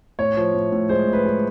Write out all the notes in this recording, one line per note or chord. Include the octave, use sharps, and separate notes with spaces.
A2 C#5
F3
A2
A2
G#3 C5
A2
B4
G#3